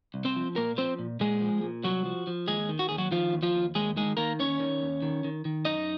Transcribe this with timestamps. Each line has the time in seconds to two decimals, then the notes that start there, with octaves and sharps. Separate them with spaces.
0.14 C2
0.25 C4 C5
0.36 F3
0.56 A#2 A#3 A#4
0.78 F3 C4 C5
0.99 A#2
1.20 A#2 G#3 G#4
1.41 F3
1.62 A#2
1.84 C2 F#3 F#4
2.05 F3
2.27 F3
2.48 D#2 G#3 G#4
2.69 D#3
2.79 F#4
2.89 D#2 G#4
2.98 F#3 F#4
3.11 D#3 F3 F4
3.33 D#2
3.43 F3 F4
3.55 D#2
3.75 D#2 G#3 G#4
3.96 D#3 G#3 G#4
4.17 D#3 A#3 A#4
4.39 D#2 C#4 C#5
4.60 D#3
4.82 D#2
5.02 D#3
5.24 D#3
5.45 D#3
5.65 F#2 D#4 D#5